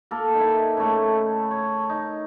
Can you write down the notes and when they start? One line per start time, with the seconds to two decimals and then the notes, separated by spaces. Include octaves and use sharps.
0.11 A#3 A4 A#4
0.34 D#4 E4
0.77 C#3 A3
1.51 C#5
1.89 D#4